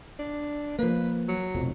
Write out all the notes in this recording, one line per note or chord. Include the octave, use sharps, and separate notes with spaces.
D4
F3 A#3 B4
F#3
F1 B1 F2